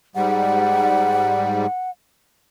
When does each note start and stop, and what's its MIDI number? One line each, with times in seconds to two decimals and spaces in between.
0.15 1.66 44
0.15 1.66 55
0.15 1.90 78